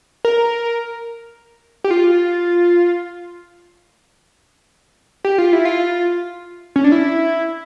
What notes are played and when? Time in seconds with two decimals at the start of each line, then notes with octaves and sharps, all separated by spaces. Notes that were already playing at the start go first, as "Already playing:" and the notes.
0.25 A#4
1.84 G4
1.91 F4
5.25 G4
5.38 F4
5.53 E4
5.65 F4
6.76 C#4
6.84 D4
6.92 E4